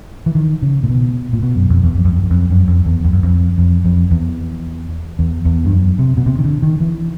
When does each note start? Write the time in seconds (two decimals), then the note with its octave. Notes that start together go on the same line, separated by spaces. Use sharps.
0.26 E3
0.35 D#3
0.62 C#3
0.83 A#2
0.89 B2
1.33 A#2
1.42 B2
1.56 F#2
1.70 F2
1.84 E2
1.97 F2
2.05 F#2
2.13 F2
2.23 F#2
2.31 F2
2.50 F#2
2.68 F2
2.85 E2
3.05 F2
3.13 F#2
3.23 F2
3.58 F2
3.85 F2
4.11 E2
5.19 E2
5.45 E2
5.65 G2
5.72 F#2
5.99 C3
6.17 B2
6.26 C3
6.38 D#3
6.44 D3
6.62 D#3
6.80 E3